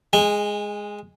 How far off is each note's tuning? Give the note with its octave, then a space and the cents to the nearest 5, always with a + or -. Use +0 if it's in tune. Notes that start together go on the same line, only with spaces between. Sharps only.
G#3 +0 G#5 -30